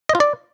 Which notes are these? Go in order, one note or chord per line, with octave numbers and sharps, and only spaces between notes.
D#5
F4
D5